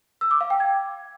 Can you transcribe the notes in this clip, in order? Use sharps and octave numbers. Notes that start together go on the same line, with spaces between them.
E6
D6
F5
G5
G#6